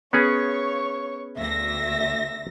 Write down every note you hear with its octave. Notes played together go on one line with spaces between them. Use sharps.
B3 C#4 G#4 C#5 C#6
D2 E5 A#6